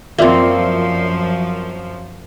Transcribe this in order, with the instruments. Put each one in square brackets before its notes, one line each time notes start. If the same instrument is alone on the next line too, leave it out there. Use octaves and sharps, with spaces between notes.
[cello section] F#2 F3 [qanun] A#3 C4 [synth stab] F4 D5 E5